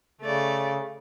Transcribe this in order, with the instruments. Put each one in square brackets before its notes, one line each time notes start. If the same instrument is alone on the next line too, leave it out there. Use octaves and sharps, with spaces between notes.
[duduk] C#3 [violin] A3 D5